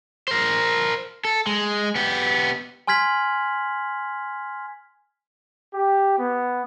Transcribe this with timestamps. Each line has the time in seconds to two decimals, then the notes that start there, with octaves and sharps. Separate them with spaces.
0.28 A#4 C5
1.25 A4
1.47 G#3
1.95 B3 G4
2.87 G#5 C6 F6 G#6 B6 F#7
5.73 G4
6.19 B3